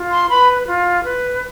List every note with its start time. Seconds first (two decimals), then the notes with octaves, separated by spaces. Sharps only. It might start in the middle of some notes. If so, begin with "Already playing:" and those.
Already playing: F4
0.10 C6
0.28 B4 B5
0.66 F4
1.04 B4